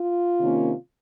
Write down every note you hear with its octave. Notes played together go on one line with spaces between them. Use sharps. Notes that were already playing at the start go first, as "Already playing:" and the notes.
Already playing: F4
C3 D#3 A#3 C#4